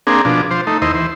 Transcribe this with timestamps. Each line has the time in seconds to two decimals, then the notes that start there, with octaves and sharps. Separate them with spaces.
0.07 A#3 C4 D4 G#4
0.25 B2 F3 D4
0.51 F3 C5
0.67 A3 D#4
0.82 D#2 E4 C5 D#5
0.94 E3 C5